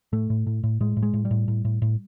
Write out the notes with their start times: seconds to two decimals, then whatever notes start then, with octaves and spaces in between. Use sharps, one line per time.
0.13 A2 A3
0.30 A2
0.47 A2
0.64 A2
0.80 A2 G#3
0.97 A2
1.03 G#3
1.14 A2
1.25 G3
1.31 A2
1.48 A2
1.65 A2
1.82 A2